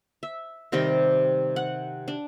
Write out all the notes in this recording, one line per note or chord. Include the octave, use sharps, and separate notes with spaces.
E5
C3 D#3 G3 G4
F#5
D4